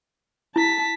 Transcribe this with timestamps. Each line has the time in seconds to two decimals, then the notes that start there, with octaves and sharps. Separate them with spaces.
0.56 E4 A5 B6